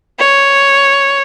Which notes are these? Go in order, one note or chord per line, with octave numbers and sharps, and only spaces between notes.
C#5